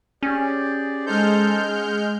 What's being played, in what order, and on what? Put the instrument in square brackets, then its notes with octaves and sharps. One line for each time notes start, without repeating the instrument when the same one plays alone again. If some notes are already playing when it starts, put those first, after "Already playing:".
[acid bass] C#4 [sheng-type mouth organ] G4 G#4 D5
[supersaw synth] G#3 F6 G6 [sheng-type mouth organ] D#4 A4 C5
[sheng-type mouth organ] F#5